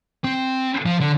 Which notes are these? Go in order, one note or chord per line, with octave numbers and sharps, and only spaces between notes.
C4
F3
D3